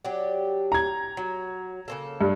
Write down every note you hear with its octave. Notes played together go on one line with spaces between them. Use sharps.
F#3 D4 G4
A#5 G#6
F#3
C#3 A#3 A4
G2